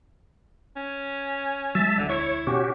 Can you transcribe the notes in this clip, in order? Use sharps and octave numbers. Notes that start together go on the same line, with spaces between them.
C#4
F#3 G#3 E5 A5
E1 D2 D3
E4 C#5 C#6
B2 C#4 F#4 G4